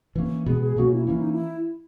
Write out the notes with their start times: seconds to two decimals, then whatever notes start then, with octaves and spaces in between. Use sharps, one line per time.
0.15 E3 A#3 C#4
0.46 B2 G#3 B3 G#4
0.61 G#4
0.76 B2 F#3 A#3 C#4 F#4
0.91 E4
1.06 E3 A#3 C#4 E4
1.19 D#4
1.31 E4